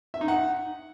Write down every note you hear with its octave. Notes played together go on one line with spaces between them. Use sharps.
E5
D#4
F#5